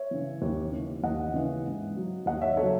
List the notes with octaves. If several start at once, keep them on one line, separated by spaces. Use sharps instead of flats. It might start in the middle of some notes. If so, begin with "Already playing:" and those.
Already playing: C#5 E5
C#3 E3
D#2
C#3 E3
D#2 D#5 F#5
C#3 E3
G#2
F#3
D#2 D#5 F#5
C#5 E5
C#3 F#3 A4 C#5